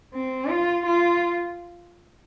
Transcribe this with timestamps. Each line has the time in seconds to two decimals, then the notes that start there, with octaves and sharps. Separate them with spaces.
0.14 C4
0.50 F4
0.86 F4